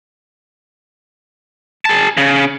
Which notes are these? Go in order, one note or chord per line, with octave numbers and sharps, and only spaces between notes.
G#4 A5
C#3